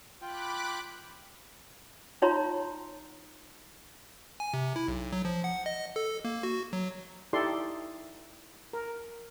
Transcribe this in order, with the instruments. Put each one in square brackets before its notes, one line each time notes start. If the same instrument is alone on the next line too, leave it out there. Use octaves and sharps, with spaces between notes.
[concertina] F4 G5 [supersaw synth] B5 D6 F#6
[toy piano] D#4 F4 C#5 A#5 C6
[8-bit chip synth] G#5
C3
E4
B1
F#3
F3
F#5
D#5
A4
A#3
F#4
F#3
[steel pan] D#4 E4 G4 A4 D5 C6
A#4